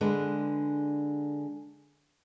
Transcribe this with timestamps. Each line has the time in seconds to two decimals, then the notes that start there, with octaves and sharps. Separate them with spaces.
0.01 D3 G#3 D4 B4